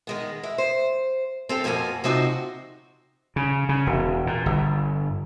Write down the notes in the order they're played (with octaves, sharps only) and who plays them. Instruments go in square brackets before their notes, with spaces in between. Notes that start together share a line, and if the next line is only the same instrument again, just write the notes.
[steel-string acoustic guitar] D#3 G#3 B3
G#3 E4
C5
C4 G4 A4
F2 B2 F3 A#3 G#5
C3 F3 C4 D#4 F#4
[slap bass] C#3
C#3
E1
A#2
G1